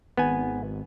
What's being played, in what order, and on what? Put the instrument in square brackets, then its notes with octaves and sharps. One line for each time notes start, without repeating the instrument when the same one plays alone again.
[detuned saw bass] G#1 [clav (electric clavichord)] B3 G#5